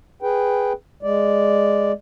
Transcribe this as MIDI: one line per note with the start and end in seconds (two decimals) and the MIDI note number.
0.22 0.73 68
0.22 0.73 71
0.22 0.73 79
1.03 1.92 56
1.03 1.92 74